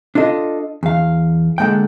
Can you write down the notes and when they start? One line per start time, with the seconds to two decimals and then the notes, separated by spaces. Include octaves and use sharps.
0.15 D4 F4 A4 D#5
0.83 E2 F5
1.58 D3 G#3 A#3 F#5 G5